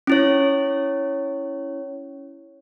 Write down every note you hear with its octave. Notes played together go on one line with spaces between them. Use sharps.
C#4 E4 C#5